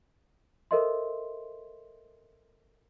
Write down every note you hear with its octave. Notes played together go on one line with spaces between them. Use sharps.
A4 A#4 C5 D#5 E5 C6